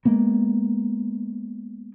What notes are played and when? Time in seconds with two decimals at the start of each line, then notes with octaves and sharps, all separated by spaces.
0.05 G#3 A#3 B3